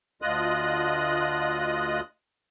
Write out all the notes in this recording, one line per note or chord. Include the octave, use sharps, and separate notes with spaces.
D2 F4 D#5 D#6 F#6